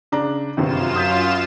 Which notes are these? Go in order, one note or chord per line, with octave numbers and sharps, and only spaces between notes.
C#3 D4 A#5
G1 F#2 C3 D#3 F4 E7
D#6 G6 B6